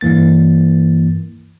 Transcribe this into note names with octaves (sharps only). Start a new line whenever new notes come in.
G2 E3 A#3 A6